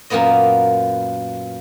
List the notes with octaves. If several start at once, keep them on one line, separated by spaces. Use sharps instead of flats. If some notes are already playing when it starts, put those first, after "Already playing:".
F#2 A#2 A#3 B3 D#5